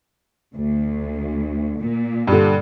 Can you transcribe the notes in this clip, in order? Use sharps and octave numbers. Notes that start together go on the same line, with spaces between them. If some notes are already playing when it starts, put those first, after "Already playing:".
D2
A#2
G2 D3